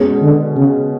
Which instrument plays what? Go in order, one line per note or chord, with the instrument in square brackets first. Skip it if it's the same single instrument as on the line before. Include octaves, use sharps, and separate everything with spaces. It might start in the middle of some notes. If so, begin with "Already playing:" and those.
Already playing: [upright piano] B2 G#3 C#4 G#4
[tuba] D3
C#3